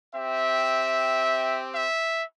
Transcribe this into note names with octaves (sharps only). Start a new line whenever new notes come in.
C4 G4 E5
E5